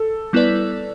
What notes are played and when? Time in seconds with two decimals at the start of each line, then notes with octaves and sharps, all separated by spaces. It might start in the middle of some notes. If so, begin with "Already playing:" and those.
Already playing: A4
0.33 G3 B3 E4 B4 D5